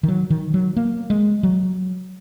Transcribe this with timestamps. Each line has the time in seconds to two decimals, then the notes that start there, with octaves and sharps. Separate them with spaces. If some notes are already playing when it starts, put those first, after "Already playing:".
0.03 D#3
0.08 F#3
0.30 D#3
0.54 F#3
0.76 A#3
1.10 G#3
1.43 F#3